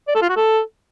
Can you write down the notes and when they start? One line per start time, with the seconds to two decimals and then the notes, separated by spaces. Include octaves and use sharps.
0.08 D5
0.15 A4
0.22 F4
0.29 F#4
0.37 A4